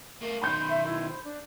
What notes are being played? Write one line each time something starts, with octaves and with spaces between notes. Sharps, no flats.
A3 A#3
B1 D#3 B5 C6 G6
E5
E4
C5
D4